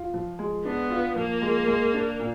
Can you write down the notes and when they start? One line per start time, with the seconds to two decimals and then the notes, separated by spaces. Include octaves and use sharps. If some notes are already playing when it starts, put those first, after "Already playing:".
Already playing: F4
0.14 F3
0.39 G#3
0.64 B3 D4
0.90 F4
1.16 F3 A#3
1.42 G#3
1.68 G#3
1.94 D4
2.19 A#2